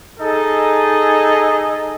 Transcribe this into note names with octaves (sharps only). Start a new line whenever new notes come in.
D#4 G#4 A4 D#5